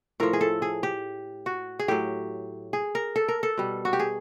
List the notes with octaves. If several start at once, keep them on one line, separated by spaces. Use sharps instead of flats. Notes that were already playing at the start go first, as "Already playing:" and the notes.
A2 F3 A#4
G#4
A4
G#4
G4
F#4
G#4
A2 F#3 G4
G#4
A#4
A4
A#4
A4
B2 G3
F#4
G4
G#4